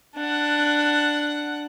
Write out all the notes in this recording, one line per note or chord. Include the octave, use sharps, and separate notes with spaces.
D4 F#5